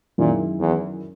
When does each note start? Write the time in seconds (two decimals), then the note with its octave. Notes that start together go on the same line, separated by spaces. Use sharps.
0.18 F#2 A#2 D#3 G#3 C#4 E4
0.60 E2